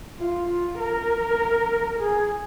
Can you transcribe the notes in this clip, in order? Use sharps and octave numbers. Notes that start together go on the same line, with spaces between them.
F4
F4
A#4
G#4